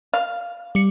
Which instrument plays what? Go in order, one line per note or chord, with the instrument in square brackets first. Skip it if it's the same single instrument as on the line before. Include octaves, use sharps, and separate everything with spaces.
[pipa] F5
[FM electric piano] G3 C#7